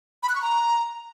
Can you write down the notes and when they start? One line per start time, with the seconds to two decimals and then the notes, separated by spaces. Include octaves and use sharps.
0.23 B5
0.29 F#6
0.36 C#6
0.42 A#5